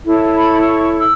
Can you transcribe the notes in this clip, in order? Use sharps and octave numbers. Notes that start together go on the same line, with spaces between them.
E4 A4 C#5
B5
C#6
E6